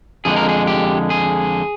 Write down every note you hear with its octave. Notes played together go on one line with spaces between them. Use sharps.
F2 D3 G#3 G#4
A#4
G#4
G4
G#4